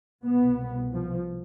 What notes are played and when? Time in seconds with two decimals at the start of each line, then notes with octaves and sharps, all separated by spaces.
0.22 C2 B2 B3
0.92 F3